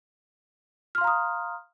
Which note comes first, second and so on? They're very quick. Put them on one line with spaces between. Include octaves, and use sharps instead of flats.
F6 C6 F5 A#5 D#6